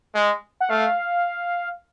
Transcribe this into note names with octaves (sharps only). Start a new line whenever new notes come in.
G#3
F#5
A3 F5